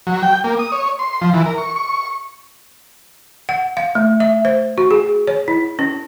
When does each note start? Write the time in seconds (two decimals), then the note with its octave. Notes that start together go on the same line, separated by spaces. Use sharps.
0.07 F#3
0.23 G5
0.44 A#3
0.59 D#6
0.72 C#5
0.99 C6
1.21 F3
1.34 E3
1.46 A#4
1.58 C#6
1.76 C#6
1.89 C#6
3.49 F#5
3.77 F5
3.95 A3
4.20 E5
4.45 C5
4.78 F#4
4.91 G#4
5.27 C#5
5.48 E4
5.79 C#4